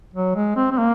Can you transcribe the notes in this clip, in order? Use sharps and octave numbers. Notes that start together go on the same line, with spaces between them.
F#3
G#3
C4
C4
A#3